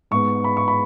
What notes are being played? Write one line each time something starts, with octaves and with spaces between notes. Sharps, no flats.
G#2 G#3 B3 C#6
B5
C#6
B5